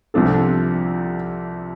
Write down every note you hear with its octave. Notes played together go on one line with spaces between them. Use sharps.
C2 C3 F3 D4 A4